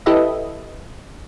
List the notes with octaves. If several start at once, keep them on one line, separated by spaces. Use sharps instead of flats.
E4 G4 A4 B4 D#5 E5